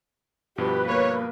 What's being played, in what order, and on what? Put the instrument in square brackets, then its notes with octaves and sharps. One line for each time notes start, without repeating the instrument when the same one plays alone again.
[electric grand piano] G2 B2 F3 [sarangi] G4 [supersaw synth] B4
[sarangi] A#3 [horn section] C#5